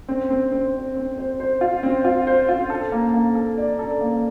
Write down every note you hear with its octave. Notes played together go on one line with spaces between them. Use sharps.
C4
C4
C4
C5
C4
C5
C5
F4
C4
F4
C5
F4
A4
A#3
A#3
A4
D5
A4
A#3